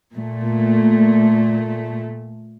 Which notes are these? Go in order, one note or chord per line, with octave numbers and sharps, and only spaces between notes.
A#2 A3